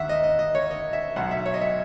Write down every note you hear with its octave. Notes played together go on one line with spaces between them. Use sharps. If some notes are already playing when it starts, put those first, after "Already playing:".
Already playing: D#2 E5 F#5
D#5
D#5
D#5
C#5
D#5
E5
B1 B2 F#3 F#5
E5
C#5
D#5
E5